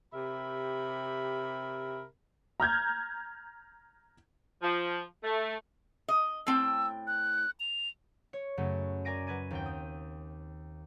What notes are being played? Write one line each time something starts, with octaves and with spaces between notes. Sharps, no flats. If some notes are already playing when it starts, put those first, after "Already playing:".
C3 G4 A#4 E5 B5
A#5 F6 G6 G#6
F3
A3
D#5
A2 C4 G5 E6
F#6
F7
C#5
F#2 C#3 F#3 A3
A#4 D5 G#5 A#6 D7 D#7
F#3 B4 G#6 D#7
D#2 C4 G5
D#6